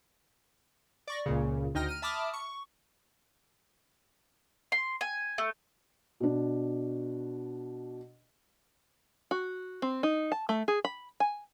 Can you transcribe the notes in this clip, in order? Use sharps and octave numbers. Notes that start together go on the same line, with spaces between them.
D5 C#6 A#6
C#2 A#2 C#3
D2 D#4 G5 F6 A#6
F6 D#7
E5 A5 B5 D6 D#6 F6
C#6
C6
G#5
A3
B2 D4
F#4
C4
D#4
A5
A3
G#4
B5
G#5